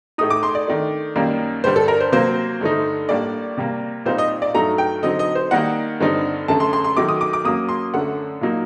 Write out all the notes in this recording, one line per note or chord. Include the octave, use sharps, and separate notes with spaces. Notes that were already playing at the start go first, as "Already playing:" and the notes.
A2 A3 D#4 D#6
D6
C6
D5
D#3 A3 D4
F#2 D#3 G3 A#3
G2 D3 G3 D4 C5
A4
A#4
C5
C3 F#3 A#3 C5
G2 D3 A3 D#4
A2 G3 A#3 D4 D5
C3 G3 A#3
A#2 G3 C4 D#4 C5
D#5
D5
G2 F#3 A3 D#4 A#5
G5
D3 F#3 C4 D#4 D#5
D#5
C5
D#3 G3 A#3 D#4 F#5
G2 D3 G3 C4 D#4
F#2 D3 A3 A5
C6
C6
C6
D#3 F#3 A3 D6
D#6
D6
D6
F#2 F#3 A#3 D#6
C6
F#2 D3 A3 F#5
A#2 F#3 A#3 D#4